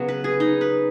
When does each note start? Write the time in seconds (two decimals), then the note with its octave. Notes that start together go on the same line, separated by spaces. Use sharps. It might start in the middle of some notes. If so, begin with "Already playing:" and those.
Already playing: C#3 F#3 B3
0.08 B4
0.24 G#4
0.40 D#4
0.61 B4